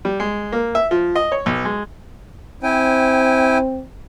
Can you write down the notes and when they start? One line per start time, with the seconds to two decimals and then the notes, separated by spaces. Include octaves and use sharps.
0.05 G3
0.20 G#3
0.52 A#3
0.75 E5
0.91 F3
1.15 D#5
1.32 C#5
1.46 B1
1.65 G#3
2.63 C4 E4 G5 G#5